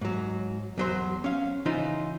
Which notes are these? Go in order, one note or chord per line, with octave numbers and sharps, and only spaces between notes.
G#2 F#3
E2 F#3 C5
C#4 F5
C#3 E3 D#4 F4 C5